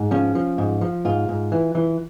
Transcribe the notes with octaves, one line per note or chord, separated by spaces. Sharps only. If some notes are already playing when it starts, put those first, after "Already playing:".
Already playing: G#2
F3 C#4
F3
G#2
F3
G#2 F4
G#2
E3
E3